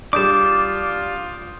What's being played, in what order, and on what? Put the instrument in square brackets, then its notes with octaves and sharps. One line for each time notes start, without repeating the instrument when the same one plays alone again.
[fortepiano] G3 D4 [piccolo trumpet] F4 [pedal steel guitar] D6 [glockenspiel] D#6 G6 E7